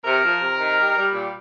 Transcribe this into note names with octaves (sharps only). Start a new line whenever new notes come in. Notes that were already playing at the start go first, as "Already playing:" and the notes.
C3 A#4
F3
C3
D#3
G3
G3
A#2